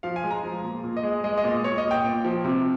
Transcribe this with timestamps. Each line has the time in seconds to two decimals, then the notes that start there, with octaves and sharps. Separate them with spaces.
0.03 F3 F5
0.16 G#5
0.24 G#3
0.31 A#5
0.44 F3
0.64 A#2
0.84 A#2
0.97 D#5
1.03 G#3
1.24 G#3 D#5
1.37 D#5
1.44 A#2
1.64 A#2 C#5
1.78 D#5
1.84 A#2
1.91 G5
2.04 A#2
2.25 F3
2.45 C3